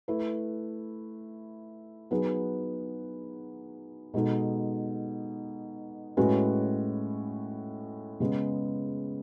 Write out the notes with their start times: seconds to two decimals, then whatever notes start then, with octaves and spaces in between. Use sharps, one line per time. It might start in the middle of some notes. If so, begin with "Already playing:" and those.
0.08 A3 E4 B4
2.11 F#3 B3 D#4 G#4 B4
4.14 B2 G#3 D#4 A4
6.17 A2 G#3 C#4 F#4 B4
8.20 C#3 G#3 B3